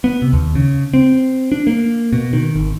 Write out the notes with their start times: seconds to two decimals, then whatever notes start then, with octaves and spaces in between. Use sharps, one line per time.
0.04 B3
0.22 C3
0.33 D#2
0.55 C#3
0.94 C4
1.52 D4
1.67 A#3
2.13 B2
2.33 D#3
2.56 G#1